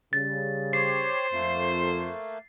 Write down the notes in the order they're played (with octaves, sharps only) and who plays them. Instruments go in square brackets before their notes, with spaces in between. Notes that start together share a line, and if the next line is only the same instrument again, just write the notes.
[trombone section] C#3 G3 [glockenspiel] A6
[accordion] G4 C#5 [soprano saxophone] C5 [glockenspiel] C7
[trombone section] F2 [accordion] A3 A#3